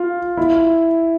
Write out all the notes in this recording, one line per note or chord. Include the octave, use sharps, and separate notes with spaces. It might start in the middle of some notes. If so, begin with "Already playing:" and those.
Already playing: F4
E4